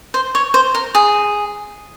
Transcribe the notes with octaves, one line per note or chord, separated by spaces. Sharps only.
C5
C#5
C5
A#4
G#4